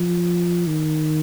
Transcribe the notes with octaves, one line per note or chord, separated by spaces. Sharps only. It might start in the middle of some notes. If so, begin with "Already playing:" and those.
Already playing: F3
D#3